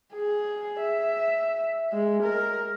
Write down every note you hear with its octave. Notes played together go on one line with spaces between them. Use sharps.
G#4
E5
G#3
A#4